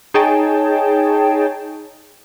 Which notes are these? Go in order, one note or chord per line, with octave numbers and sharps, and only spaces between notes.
D#4 G#4 C#5 G5 A5